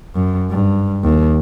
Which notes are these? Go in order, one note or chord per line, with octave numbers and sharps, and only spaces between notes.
F#2
G2
D#2